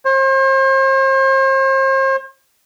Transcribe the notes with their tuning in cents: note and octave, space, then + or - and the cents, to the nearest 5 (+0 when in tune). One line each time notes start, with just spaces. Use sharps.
C5 +40